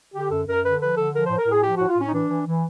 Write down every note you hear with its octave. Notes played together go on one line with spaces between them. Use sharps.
D3 G4
F#2 A4
F#2 A#4
D3 B4
F3 B4
D3 A4
F3 A#4
C5
A2
A#4
A2 G#4
F3 G4
F#4
A2
F4
A2 C#4
D#4
E3 D4
E3
E3